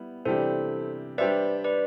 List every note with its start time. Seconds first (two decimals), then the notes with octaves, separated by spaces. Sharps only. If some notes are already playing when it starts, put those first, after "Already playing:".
Already playing: G3 B3 E4
0.25 C3 E3 G3 D4 G4 A4 C5
1.18 G3 D4 G4 B4 C5 D5 E5
1.64 B4 D5